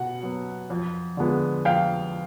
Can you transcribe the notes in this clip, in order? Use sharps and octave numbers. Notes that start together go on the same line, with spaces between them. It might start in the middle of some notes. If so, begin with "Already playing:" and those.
Already playing: B2 F#5
F#3 B3
F2
D3 F3 G#3 B3
F2 F5 G5